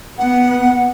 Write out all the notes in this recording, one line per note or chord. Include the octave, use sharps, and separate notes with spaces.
B3 F#5